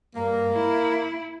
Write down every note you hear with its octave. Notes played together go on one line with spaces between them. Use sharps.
G2 A#3
E4